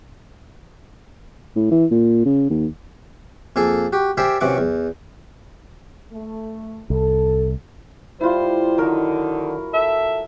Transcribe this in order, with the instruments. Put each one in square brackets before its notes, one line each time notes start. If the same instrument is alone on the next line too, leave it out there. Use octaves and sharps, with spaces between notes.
[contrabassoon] A2
E3
A#2
C#3
D#2
[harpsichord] F2 A#3 G#4 A4 G#5
F#4 G4
G4 A#4 C5 D5 E5 G#5
F#2 C3 E3 F#5 C#6 D6
E2
[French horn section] A3
[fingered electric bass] C2 [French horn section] A4
[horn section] G3 C5 [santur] E4 F4
[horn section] D3 D#3 [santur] F#3 A#4
[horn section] A4 E5